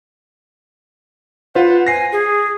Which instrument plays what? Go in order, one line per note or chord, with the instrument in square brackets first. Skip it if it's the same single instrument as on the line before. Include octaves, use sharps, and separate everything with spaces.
[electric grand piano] F4 B4 C5 [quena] F#5
[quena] G#5 [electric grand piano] A#6 C7
[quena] G#4